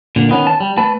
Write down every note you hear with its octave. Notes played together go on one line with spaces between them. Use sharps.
A#2 D3
D#3 B3 C#4
A5
G3
A3 B4 A5